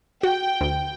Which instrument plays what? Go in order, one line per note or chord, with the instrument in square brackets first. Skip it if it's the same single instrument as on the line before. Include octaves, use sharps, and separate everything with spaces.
[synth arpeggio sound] F#4 [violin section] G5
[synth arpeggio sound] D2